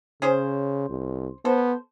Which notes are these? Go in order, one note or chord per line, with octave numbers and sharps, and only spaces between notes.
C#3 C#4 G#4 C5
C2
B3 A4 C5